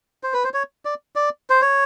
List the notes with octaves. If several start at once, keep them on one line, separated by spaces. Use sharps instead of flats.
C5
B4
C5
C#5
D5
D5
C5
C#5